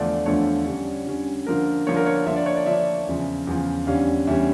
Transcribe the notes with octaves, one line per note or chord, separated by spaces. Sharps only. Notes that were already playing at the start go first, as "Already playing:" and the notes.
Already playing: E2 D3 F3 A3 D4 D5
E2 D3 F3 A3 D4 C#5
D3 G3 C#4
D3 G3 C#4
D3 F3 A#3 A#4
D3 F3 A#3 C#5
A#4
C#5
D3 F3 A#3 D4 E5
D5
C#5
D5
D3 F3 A#3 D4 E5
E2 C#3 F3
E2 C#3 F3
E2 D3 G3 C#4 F5
E2 D3 G3 C#4 E5